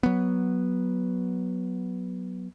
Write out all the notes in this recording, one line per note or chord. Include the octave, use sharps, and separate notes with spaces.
F#3 B3